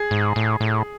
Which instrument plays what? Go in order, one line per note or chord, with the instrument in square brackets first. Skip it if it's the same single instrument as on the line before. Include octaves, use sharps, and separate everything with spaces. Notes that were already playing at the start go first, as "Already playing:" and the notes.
Already playing: [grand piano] G#4
[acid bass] G#2
A2
A2